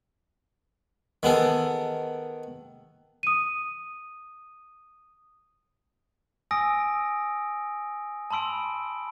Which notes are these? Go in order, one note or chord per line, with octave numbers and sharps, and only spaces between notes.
D#3 B3 G#4 A4
D#6 D#7
G#5 D#6 E6 A#6 D7
A5 B5 C6 E6 D7